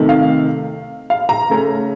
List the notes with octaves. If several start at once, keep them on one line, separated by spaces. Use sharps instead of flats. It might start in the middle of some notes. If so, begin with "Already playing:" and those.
Already playing: C3 D#3 A3
F5
F5
A#5
C#3 A3 C#4